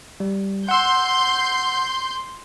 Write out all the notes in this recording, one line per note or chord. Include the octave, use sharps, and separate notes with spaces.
G3
F#5 C6 E6 G6